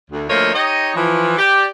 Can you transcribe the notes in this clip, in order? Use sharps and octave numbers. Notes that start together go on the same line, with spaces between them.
D2
D2 F3 A3 A#3 C#5 D#5
D#4 G4 C#5 D#5
E3 F3
G4 D5